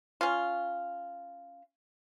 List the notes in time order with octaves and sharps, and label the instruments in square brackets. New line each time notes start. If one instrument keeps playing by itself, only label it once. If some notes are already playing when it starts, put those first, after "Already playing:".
[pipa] C#4 F4